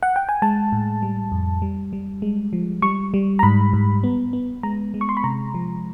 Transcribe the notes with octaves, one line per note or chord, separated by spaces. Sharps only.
F#5
G5
G#5
G#3 A5
A2
G3
F2
G3
G3
G#3
F3
G3 C#6
G3
A#5
G#2 B5
G#2
B3
B3
G#3 A#5
G#3
C#6
C6
B5
C3 A#5
F3